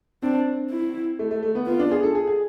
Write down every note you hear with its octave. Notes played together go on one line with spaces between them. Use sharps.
C4 D4
E4
A3
A3
A3
B3
B3 F4
D4
G#4
A4
G#4
G#4